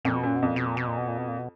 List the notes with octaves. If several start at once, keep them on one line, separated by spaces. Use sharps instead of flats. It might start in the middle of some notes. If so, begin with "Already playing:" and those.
F2 A#2
B2
F#2 A#2
B2
F2 A#2
B2
A#2
B2
A#2
B2
A#2
B2
A#2
B2